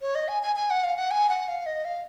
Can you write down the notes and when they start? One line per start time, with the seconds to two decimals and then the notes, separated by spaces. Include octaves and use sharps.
0.02 C#5
0.15 D#5
0.28 G#5
0.43 G#5
0.56 G#5
0.70 F#5
0.84 F5
0.97 F#5
1.11 G#5
1.29 F#5
1.48 F5
1.66 D#5
1.85 F5